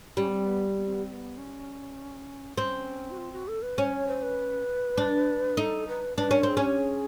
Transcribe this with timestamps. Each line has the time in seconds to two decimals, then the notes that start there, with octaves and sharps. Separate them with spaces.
0.17 G3 C#4
0.28 B3
0.32 C4
0.46 B3
0.77 B3
0.86 C4
0.94 B3
1.03 C4
1.12 B3
1.37 C#4
2.57 C4 C#4
3.11 F#4
3.18 F4
3.32 F#4
3.48 A4
3.62 B4
3.77 C#4 C5
3.93 C#5
4.07 C5
4.23 B4
4.98 D4
5.57 D#4 A4
5.88 B4
6.18 D4 B4
6.31 C#4 A#4
6.43 C4 G#4
6.57 C#4
6.63 G4
6.78 G#4